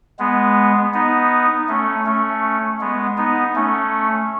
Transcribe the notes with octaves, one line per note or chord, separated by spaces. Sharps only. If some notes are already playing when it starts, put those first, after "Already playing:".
G#3 B3
B3 D#4
A3 C#4
A3 C#4
G#3 B3
B3 D#4
A3 C#4